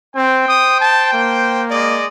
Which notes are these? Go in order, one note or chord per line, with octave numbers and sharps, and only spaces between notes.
C4 C5 G5
D#6
A5
A#3
G#3 D5 D#5